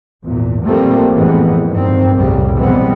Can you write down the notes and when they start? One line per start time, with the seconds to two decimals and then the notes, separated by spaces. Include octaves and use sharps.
0.24 G#1 E2 A#2
0.64 A#2 F3 G3 A3 A#3 C4
1.14 F2 A2 E3 G#3 B3
1.70 G2 D#3 C4
2.15 C2 F2 A2 C#3 G3
2.56 B2 E3 G3 G#3 B3 C4